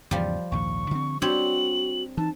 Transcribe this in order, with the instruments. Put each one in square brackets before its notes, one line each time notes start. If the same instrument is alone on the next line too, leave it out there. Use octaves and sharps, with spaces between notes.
[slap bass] E2 G#2 C#3 [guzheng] F3 G3
[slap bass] A#1 D#2 G#2 [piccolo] C#6
[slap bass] D3 C4
[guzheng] G3 C4 C#5 [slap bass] D4 [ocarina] F#4 [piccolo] F#7
[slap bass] E3 [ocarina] D#4 [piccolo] A5